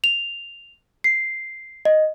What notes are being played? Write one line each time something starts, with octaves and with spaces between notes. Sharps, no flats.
F7
C7
D#5